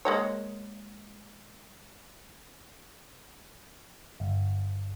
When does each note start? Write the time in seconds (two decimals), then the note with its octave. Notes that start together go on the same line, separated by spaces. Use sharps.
0.05 G#3 A#3 C#5
4.20 G1